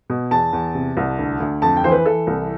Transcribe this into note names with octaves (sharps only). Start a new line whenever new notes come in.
B2
E2 A5
E2
C3
C2
D2
D2
F2 A5
G5
E3 C5
B4
E3 A4
C2